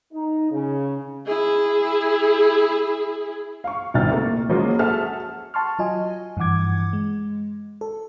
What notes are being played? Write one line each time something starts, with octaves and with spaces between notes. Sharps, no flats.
D#4
C#3
E4 G#4
F5 C#6
G1 C2 C3 D#3 F6 A6
A3 A#3
F3 F#3 G#3 A#3 C#4 F4
F#4 G#4 A4 E5 A5 F6
F#5 A5 C6 C#6 F6
F#3 F4 D#5 G#5
G2 E3 F3 F#5 D6 G#6
G#3
A4